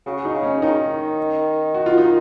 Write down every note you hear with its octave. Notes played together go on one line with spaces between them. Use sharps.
C#3 F#4
D#4
C#3
C#4
D#3 D#4
F#4
F4
D#4